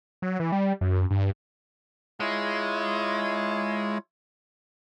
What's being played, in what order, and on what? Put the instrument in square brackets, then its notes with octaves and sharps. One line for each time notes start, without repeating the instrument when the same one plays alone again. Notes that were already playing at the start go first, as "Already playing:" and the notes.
[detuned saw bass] F#3
E3
G3
F#2
G2
[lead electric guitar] G#3 [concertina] E4 F4 C#5